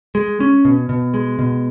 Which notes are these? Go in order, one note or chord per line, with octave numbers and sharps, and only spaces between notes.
G#3
C#4
B2
B2
G#3
B2